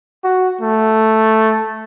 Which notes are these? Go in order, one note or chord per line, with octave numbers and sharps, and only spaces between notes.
F#4
A3